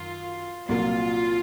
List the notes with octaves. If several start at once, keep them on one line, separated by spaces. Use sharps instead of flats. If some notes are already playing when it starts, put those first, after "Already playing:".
Already playing: F#2 D#3 F4
C2 A#2 F#3 A#3 F4